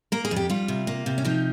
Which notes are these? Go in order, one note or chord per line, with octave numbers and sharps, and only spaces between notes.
A#3 A#4
G#4
F2
G4
G3 F4
C3
A#3
C3
C#4
F3 D#4